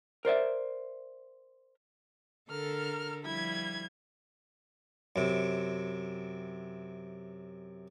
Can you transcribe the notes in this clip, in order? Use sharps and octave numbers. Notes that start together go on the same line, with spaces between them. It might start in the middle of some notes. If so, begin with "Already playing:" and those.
A#4 C5 D5 E5
D3 A4 A#4 F6
F3 G3 E4 B5 G#6
F#2 C3